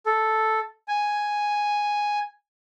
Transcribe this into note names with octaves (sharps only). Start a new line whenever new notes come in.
A4
G#5